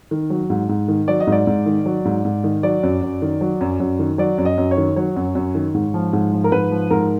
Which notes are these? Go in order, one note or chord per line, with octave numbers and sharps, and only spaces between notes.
D#3
F#3
G#2
G#2
D#3
F#3 D5
D#5
G#2
D5
G#2
D#3
F#3
G#2
G#2
D#3
F#3 D5
F#2
F#2
D#3
F#3
F#2
F#2
D#3
F#3 D5
F#2
D#5
F#2
C#5
D#3
F#3 C#5
F#2
F#2
D#3
G#2
F3
G#2
F3
A#4
G#2 B4
F3
G#2 A#4